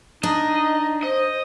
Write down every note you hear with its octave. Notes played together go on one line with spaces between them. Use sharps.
D4 D#4 D#5
C5 D#5